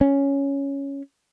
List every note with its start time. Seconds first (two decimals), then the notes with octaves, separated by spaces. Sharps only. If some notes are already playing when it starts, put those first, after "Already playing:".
0.01 C#4